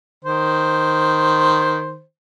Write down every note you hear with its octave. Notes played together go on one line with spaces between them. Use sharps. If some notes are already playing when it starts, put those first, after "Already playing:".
D#3 C5